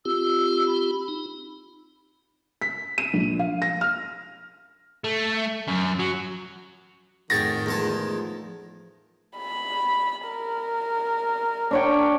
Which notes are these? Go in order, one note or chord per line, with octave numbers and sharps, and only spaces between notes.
C4 F4 G4 E6
B5
D#4
B6
D#7
A#1
F5
A#6
F6
A3
F#2
F#3
F2 A2 D#3 F#4 G#4 G5 A6 A#6
E2 F3 G#3 A3 A5
B5
A#4
D4 C#5 G5